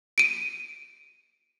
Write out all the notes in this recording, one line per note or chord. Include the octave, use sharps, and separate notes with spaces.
D7 D#7